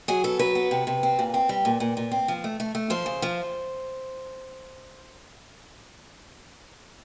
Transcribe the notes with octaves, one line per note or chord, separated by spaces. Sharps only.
F#3 G#4
B3 A4
F#3 B4
B3
C3
C3
C4
A#2
C4
G3
A#2
A#2
A#2
C4
F3
A3
A3
A3
F3 C5
C#3
F3